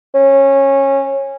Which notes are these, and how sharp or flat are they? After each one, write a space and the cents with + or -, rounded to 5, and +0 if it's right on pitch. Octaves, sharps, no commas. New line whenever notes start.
C#4 -20